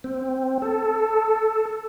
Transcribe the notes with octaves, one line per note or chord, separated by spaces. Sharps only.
C4
A4